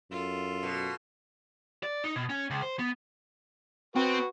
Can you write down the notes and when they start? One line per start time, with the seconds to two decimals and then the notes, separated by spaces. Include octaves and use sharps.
0.11 F#2 F4 A4
0.63 B2
1.83 D5
2.04 D#4
2.16 B2
2.30 C#4
2.50 C#2
2.62 C5
2.79 B3
3.96 C4 F#4 B4